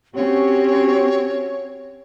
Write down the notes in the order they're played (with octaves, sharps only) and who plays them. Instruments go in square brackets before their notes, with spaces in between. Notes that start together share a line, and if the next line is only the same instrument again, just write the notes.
[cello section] C4 C#4 F#4 [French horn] G4 [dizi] C#5